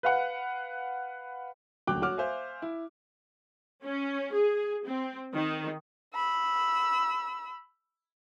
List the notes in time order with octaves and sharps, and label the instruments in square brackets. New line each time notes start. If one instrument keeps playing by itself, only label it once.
[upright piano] B4 F5 F#5
[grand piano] D#1 D2 F#3 G5 D6 F#6
F#4 C#5 D6 F6
C5 E5 F5 G#5
E4
[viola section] C#4
G#4
C4
D#3
[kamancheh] B5 E6